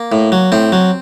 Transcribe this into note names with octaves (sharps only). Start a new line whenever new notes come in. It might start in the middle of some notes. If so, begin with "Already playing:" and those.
Already playing: A#3
A2
F#3
A2 C4
F#3